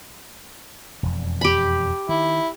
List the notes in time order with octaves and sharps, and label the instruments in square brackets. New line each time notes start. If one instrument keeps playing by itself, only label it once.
[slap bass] E1 F2
[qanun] G4 B5
[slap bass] D#3 [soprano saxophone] E4